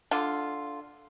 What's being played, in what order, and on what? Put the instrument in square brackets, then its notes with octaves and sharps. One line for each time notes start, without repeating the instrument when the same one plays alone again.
[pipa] D3 F4